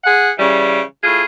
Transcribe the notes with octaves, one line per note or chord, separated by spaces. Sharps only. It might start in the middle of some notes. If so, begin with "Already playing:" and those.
G#4 F#5
C#3 E3 G3
A2 F4 G#4